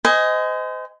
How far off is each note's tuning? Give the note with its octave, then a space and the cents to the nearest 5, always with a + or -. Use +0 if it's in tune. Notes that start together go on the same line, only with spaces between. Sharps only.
C5 -35 D#5 +10 G#5 +0